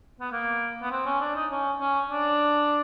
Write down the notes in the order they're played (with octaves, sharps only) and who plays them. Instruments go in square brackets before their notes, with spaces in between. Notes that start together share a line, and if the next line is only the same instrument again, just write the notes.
[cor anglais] B3
A#3
B3
C4
C#4
D4
D#4
C#4
C#4
D4